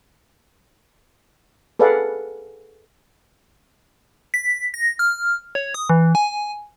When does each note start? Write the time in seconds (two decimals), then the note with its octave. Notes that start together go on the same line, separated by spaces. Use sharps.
1.79 G#4 A4 B4 D5 F5 F#5
4.34 B6
4.74 A#6
4.99 F6
5.55 C#5
5.74 D#6
5.90 E3
6.15 G#5